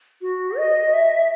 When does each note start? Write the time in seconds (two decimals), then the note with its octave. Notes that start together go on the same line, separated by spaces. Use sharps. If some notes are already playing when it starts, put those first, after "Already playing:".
0.21 F#4
0.57 D#5
0.93 E5